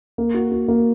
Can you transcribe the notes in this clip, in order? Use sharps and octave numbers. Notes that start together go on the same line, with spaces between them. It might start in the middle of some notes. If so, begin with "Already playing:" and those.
A#3
F#4
F#4
A#3